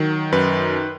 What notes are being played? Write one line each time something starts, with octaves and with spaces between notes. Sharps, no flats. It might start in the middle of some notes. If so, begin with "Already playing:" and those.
Already playing: D#3 F#3
F#2 B4